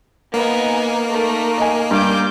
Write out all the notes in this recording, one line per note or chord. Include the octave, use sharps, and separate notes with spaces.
A#3 B3 D#4 G#5
A3 D#4 A#4
D#5 G#5
G2 D6 G6